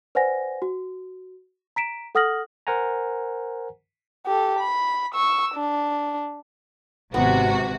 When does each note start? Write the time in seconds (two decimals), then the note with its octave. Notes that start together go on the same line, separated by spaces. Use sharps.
0.15 B4 C5 D5 F#5 G#5 A#6
0.62 F#4
1.76 A#5 B6 D7 E7
2.15 A4 F#5 D#6 F6 A#6 F#7
2.67 A#4 C5 F#5 G#5 A#5
4.26 G4 A4
4.59 B5
5.14 C#6 E6
5.55 D4
7.14 G#1 C3 B3 F#4